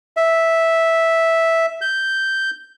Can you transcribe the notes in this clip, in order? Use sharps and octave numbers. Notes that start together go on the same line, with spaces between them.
E5
G6